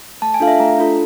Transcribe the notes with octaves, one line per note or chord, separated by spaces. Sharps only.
A3 A5
G#5
D4 F4 A4 F5
E5
A3 A#5
D4 F4 A4